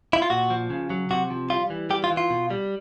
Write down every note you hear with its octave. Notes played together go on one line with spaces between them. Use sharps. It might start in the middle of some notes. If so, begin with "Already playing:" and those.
E4
F4
A#2 F#4
F3
C#3
F#3
C3 F#4
F3
G3 F4
E3
G3 G4
F4
E3
F4
B2
G3